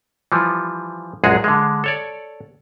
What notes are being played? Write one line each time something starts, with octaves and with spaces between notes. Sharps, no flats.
E3 F3 G3
A#1 F#2 G#3 F#4 G#4
D3 G#3
A4 C#5 D5